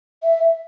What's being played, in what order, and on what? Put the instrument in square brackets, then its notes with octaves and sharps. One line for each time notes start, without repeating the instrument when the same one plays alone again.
[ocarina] E5